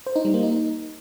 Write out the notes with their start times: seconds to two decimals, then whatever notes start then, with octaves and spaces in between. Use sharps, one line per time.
0.07 C5
0.16 D#4
0.25 G3
0.34 A#3
0.43 D#4